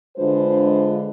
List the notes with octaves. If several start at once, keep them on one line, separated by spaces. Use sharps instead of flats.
D3 G#3 D4 F4 B4 C5